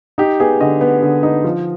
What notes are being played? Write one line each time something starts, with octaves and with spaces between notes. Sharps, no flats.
D#4 G4
B3 G#4
D3 D#5
B3
D3
D#4
F3